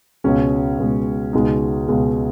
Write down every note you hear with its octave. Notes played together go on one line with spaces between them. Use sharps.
C#2 B2 G#3 C#4
C#2 B2 G#3
C#2 B2 G#3 D#4
C#2 B2 G#3